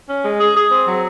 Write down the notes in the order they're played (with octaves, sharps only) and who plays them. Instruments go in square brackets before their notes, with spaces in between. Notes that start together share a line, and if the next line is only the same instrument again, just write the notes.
[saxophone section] C#4
G#3
G#4
G#4
C4
F#3